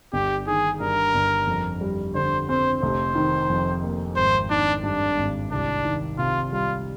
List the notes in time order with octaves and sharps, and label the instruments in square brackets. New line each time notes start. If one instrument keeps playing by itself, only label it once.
[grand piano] G1 [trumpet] G4
[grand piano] D#3 [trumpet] G#4
[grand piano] G2 [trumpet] A#4
[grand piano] G1
F2
G3
[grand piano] D3 [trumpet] C5
[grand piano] C4 [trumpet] C5
[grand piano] F1 [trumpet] C5
[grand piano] D#3
F2
A#3
[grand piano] G#1 [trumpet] C5
[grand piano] D#3 [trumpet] D4
[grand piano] G2 [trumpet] D4
[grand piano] G#1
[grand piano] C2 [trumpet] D4
[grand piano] D#3
[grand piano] C3 [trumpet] F4
[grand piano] G3 [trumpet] F4